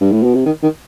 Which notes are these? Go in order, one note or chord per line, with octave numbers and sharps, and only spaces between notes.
G2
A2
B2
C3
D#3
D#3